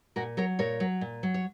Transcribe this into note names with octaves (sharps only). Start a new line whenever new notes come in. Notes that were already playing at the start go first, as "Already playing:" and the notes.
A#2 F#4 A#4
F#3 A#4 C#5
A#2 A#4 C#5
F#3
A#2
F#3
C#5